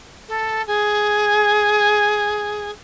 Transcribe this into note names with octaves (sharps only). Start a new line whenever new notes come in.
A4
G#4